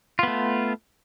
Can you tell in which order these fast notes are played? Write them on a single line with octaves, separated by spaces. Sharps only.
F4 B3 A3